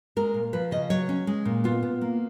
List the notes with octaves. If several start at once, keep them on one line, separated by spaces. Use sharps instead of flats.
G#3 A#4
A#2
F3 B4
C#3 D#5
F#3 C#5
C#4
G#3
A#2
B3 F4
B3
A#3